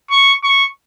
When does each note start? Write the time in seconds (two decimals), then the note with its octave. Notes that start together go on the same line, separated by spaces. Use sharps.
0.11 C#6
0.44 C#6